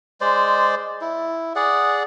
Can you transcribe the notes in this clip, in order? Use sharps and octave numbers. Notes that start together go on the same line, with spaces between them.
G#3 C5 D5
E4
G#4 D5 F#5